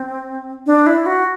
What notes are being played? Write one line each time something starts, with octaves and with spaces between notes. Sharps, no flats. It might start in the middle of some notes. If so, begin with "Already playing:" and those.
Already playing: C4
D4
E4
F#4